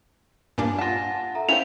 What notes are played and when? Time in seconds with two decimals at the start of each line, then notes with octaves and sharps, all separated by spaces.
0.58 G2 A#2 D4 G#5
0.78 F4 F#5 A5 A#6
1.35 A4 E5 A#5
1.49 C#4 E4 G4 C5 F5 F7